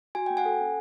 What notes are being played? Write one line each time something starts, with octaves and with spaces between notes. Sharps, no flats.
F#4 G#5
A#3 G5
F#5 G#5
A4
C#4